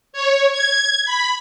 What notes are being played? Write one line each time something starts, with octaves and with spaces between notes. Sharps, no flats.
C#5
G#6
B5